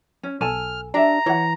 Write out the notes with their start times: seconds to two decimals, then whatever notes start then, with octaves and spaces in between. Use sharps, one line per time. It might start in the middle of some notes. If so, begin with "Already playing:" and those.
0.23 C#4
0.41 B1 A4 G#5 A5 F6
0.94 D4 G4 E5 A#5
1.26 E3 C#5 F#5